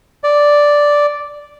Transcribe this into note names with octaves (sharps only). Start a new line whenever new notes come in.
D5